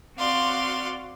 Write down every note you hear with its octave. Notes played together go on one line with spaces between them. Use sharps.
C4 F#4 D5 F5 C6